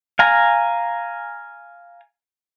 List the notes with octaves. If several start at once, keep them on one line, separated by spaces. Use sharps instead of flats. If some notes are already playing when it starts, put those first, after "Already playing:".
F5 G#5 A#5